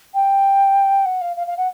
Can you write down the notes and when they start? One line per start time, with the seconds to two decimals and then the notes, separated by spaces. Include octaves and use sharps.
0.14 G5
1.05 F#5
1.21 F5
1.36 F5
1.47 F5
1.57 F#5